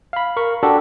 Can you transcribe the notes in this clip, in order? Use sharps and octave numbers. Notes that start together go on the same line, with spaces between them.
F5 B5
A#4 C#6
D4 F#4 G4 A4